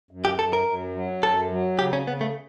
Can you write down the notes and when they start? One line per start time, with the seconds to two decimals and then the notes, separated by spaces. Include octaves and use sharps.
0.11 F#2
0.25 G4
0.39 F#2 A4
0.53 A#4
0.67 F#2
0.95 F#3
1.23 F#2 A4
1.51 F#3
1.79 C#3 G4
1.93 C#4
2.07 C#3 B3
2.21 A3